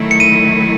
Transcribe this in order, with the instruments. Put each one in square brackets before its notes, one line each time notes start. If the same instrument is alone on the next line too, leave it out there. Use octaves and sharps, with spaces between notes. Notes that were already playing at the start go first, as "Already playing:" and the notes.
Already playing: [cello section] D#3 F#3 A3 E4
[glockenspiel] C#7
D#7